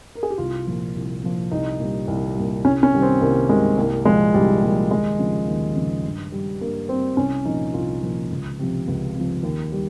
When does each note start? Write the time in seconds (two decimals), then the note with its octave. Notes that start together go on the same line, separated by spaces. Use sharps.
0.15 A#4
0.23 G#4
0.30 G4
0.38 C2 F4
0.67 A#2 F3
0.95 C2
1.23 A#2 F3
1.51 C2 D#4
1.79 A#2 G3
2.08 C2
2.36 A#2 G3
2.64 C2 C#4
2.83 C#4
2.93 C3 D#3 G3
3.02 C4
3.21 C2 A#3
3.49 C3 D#3 G3 G#3
3.78 C2 A#3
4.05 A#2 F3 G#3
4.34 C2 G3
4.63 A#2 F3 G3
4.91 D#2 G#3
5.19 C#3 F3
5.48 D#2
5.76 C#3 F3
6.04 G2
6.32 G3
6.61 G2 A#3
6.89 G3 C4
7.17 C2 C#4
7.45 A#2 F3 D#4
7.74 C2 F4
8.02 A#2 F3
8.31 C#2
8.59 C3 F3
8.87 C#2
9.15 C3
9.20 F3
9.43 D#2
9.72 G3